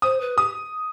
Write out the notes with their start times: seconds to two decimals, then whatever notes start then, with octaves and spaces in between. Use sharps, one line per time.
0.02 C5 D#6
0.20 B4
0.38 G4 D#6